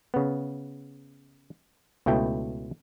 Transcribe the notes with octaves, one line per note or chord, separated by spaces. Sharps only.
C#3 B3
C#2 B2 A3 E4 G5